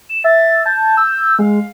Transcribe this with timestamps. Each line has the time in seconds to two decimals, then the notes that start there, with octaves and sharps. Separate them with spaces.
0.10 E7
0.24 E5 A6
0.66 A5 G6
0.97 E6
1.39 G#3 F5